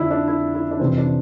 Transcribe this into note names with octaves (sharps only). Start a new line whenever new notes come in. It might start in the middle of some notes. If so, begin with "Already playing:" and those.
Already playing: F2 D3 F3 D4 E4
D4
E4
E4
D4
F2 C3 E3 C4
D4